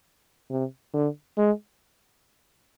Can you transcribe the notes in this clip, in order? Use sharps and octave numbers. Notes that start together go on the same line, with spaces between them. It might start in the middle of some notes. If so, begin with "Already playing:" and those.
C3
D3
G#3